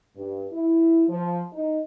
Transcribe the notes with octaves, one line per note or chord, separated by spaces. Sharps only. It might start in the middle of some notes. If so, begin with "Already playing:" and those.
G2
E4
F3
D#4